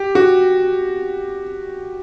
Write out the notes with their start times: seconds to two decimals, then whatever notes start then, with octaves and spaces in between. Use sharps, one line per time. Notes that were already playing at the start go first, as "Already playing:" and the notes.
Already playing: G4
0.15 F#4